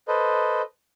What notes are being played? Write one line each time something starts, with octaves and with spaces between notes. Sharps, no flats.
A4 B4 C5 D#5